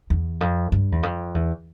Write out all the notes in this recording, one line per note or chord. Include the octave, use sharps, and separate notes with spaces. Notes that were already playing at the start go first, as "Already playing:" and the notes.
E2
F2
G2
E2
F2
E2